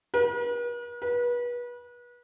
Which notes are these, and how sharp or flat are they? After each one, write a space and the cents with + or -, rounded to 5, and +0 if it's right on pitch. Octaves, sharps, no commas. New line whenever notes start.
B4 -45
B4 -30